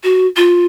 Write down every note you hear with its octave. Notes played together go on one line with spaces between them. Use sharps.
F#4
F4